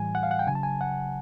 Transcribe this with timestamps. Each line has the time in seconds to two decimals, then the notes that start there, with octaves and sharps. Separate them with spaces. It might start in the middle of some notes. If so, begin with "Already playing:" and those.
Already playing: A2 E3 G3 G#5
0.15 F#5
0.23 F5
0.31 F#5
0.39 G5
0.47 C#3 F#3 G#5
0.55 A5
0.63 G#5
0.81 F#5